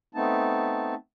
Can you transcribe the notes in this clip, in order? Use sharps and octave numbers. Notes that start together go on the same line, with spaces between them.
A3 B3 C4 D#4 A5